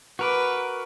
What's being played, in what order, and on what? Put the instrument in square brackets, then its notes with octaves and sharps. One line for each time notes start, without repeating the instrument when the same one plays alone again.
[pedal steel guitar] F#4 A#4 D6 [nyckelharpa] B4